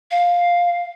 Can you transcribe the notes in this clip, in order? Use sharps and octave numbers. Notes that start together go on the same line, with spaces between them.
F5